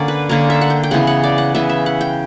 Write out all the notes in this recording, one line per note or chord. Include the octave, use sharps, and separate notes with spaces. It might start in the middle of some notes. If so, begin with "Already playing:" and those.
Already playing: D3 A#3 C#4 D5 F#5
B4
D3 A#3 C#4 A#4
E5
F#5
G5
G5
C#3 E3 B3 F#5
F#5
D5
F#5
C#3 E3 B3 E5
E5
F#5
G5